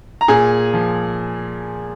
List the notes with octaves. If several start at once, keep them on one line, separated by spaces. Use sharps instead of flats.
A#5
A#2 G#4 G#5
F3